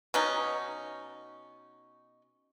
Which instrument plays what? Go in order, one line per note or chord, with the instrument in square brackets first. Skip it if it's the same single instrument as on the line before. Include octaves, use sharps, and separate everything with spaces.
[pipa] B2 C#4 D#4